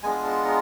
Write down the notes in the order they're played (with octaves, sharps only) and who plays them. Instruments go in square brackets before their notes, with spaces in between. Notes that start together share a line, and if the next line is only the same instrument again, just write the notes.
[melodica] G#3 B3 D4 F4 G#5
A5
A#5